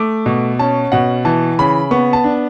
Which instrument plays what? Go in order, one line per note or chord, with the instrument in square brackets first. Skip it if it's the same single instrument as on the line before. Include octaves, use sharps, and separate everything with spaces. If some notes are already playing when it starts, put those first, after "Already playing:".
Already playing: [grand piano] A3 D6
B2
C#4 A5
B2 F#5
E3 A5
C#3 B5
B3 C#6
A5
D4